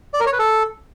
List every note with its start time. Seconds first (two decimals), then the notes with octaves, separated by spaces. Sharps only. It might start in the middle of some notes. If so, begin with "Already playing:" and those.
0.14 D5
0.20 A#4
0.26 C#5
0.33 B4
0.39 A4